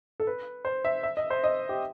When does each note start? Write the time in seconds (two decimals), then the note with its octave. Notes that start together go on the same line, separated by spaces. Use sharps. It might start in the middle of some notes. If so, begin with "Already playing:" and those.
0.20 A4
0.27 B4
0.65 C5
0.85 E5
1.03 E5
1.17 D#5
1.30 C5
1.44 D#5
1.69 G4